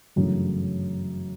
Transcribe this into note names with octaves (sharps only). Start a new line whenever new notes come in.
G1 F#2 C#3 E3 A3